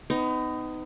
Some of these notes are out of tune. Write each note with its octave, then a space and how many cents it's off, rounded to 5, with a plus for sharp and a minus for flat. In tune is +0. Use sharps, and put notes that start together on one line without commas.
B3 +35 D#4 +0